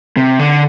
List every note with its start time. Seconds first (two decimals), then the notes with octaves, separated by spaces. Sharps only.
0.17 C3
0.39 D3